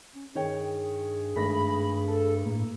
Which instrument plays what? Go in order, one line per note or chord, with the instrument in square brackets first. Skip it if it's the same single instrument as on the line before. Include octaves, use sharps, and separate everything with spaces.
[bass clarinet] C#4
[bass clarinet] G2 [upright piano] D#3 C#5 G5 [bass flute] G#4
[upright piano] G#1 A3 A#6 [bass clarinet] G2 [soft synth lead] B5
[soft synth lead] A4
[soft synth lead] A2 [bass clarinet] A#3